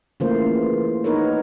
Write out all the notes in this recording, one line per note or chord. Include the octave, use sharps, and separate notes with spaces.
C#3 E3 A3 A#3 F4 C5
B3 D#4 A#4 B4 C#5